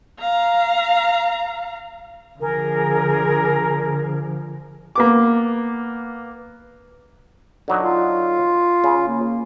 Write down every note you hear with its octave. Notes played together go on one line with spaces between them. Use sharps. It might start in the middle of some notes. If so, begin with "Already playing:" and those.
F5 A#5
D3 F3 G#4 A#4
A#3 B3 D6
D3 F#3 D#4
F4
C#3
A#3